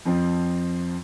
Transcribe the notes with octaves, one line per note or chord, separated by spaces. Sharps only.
F2 F3 C4